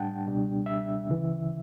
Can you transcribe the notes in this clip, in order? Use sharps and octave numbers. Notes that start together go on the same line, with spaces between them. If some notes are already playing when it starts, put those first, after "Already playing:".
Already playing: A2 G3 D4 F#5 G5 A5
C#2 B2 G3 D4
E5
D2 C#3 E3